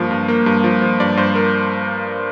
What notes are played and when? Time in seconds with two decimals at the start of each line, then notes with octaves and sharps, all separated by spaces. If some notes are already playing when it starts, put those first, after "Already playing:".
Already playing: G2 F3 A#3 F5
0.11 G2
0.28 A#3
0.46 G2
0.64 F3
0.82 F3
1.00 G2 D5
1.17 G2 C5
1.35 A#4